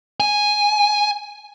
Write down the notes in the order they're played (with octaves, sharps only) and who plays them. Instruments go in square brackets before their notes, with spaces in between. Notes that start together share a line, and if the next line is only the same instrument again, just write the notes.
[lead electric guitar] G#5